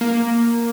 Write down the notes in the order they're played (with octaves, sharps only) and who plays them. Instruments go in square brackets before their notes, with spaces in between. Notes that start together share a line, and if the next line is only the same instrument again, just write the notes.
[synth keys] A#3